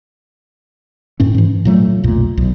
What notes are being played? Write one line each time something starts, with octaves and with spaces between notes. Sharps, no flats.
F#2 A2 C#4
G#2 E3
A#2 F#3 A3
B1 F2 A#2
B1